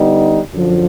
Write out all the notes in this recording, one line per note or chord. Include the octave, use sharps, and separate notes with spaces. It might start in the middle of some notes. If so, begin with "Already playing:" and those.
Already playing: D3 G3 B3 D#4
F#2 D3 F3